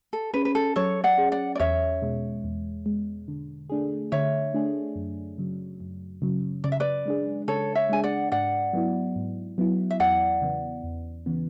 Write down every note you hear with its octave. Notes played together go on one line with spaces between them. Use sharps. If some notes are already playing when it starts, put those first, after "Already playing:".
A4
C#4 G#4 B4
B4
A4
F#3 A4 C#5
D5 F#5
C#4 G#4
D5 F#5
D5
E2 C#5 E5
B2 G#3
E2
B2 G#3
D3
A3 D4 G#4
D3 C#5 E5
A3 D4 G#4
F#2
C#3 F#3
F#2
C#3 F#3
C#3 D5
E5
B4 D5
G#3 D4 G#4
C#3 A4 C#5
C#5 E5
G#3 D4 G#4 G#5
D5 F#5
G#2 D5 F#5
F#3 B3 E4
G#2
F#3 B3 E4
E5
E2 D5 F#5
C#3 E3 B3
E2
C#3 E3 B3